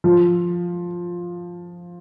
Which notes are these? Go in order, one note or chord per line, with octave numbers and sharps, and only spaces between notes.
F3